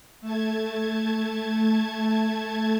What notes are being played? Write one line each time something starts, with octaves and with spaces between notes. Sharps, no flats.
A3 A5 G#6